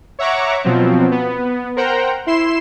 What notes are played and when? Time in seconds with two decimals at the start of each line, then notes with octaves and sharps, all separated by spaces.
0.19 C#5 E5 F#5 A#5 C#6 D6
0.64 B2 F3 F#3 C4
1.11 B3
1.76 A#4 C5 F#5 G5 A#5
2.27 E4 C6 C7 E7